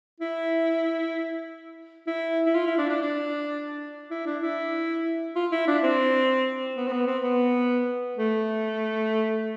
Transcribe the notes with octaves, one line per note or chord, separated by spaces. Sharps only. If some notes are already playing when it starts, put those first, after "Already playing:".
E4
E4
E4
F4
E4
D4
D4
D4
E4
D4
E4
F4
E4
D4
C4
B3
C4
B3
C4
B3
A3